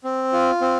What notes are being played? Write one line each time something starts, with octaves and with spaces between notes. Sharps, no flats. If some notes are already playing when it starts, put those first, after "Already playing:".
C4
F4
C4